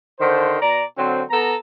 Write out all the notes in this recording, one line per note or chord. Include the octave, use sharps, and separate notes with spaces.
D3 D#3 C5
B2 D5 A#5
D3 F#3 C4
B3 A4 A#5